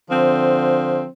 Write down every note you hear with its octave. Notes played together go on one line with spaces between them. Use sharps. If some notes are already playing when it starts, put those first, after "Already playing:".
D3 F3 C4